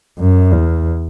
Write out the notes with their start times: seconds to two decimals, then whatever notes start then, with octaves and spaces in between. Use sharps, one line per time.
0.19 F#2
0.52 E2